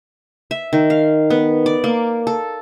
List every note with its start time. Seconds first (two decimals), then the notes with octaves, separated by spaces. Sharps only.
0.51 E5
0.73 D#3
0.90 F5
1.30 B3
1.66 D5
1.84 A#3
2.27 A4